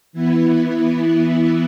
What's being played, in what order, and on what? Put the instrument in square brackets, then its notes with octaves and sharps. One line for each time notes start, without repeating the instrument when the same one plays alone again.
[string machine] E3 B3 E4